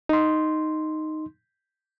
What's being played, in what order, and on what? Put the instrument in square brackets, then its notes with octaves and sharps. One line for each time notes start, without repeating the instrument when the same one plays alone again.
[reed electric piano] D#4 C6